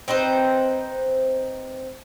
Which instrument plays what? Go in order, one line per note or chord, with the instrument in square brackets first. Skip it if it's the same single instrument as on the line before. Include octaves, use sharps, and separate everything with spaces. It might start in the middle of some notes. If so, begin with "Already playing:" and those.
[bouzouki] C4 D#4 B4 C5